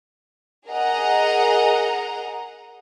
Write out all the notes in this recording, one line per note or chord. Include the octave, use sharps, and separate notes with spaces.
G#4 A#4 D#5 F#5 A#5